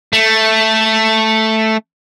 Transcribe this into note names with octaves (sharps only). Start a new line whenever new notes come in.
A3